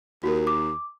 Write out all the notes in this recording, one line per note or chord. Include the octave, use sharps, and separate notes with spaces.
D#2 F#4 A#4
D6